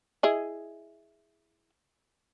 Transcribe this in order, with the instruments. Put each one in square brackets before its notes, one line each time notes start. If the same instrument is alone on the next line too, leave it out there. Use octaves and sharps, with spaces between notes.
[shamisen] E4 G#4 D#5